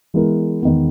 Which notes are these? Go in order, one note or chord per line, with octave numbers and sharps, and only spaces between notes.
E3 G#3 B3 E4 A#4
E2 D#3 G#3 B3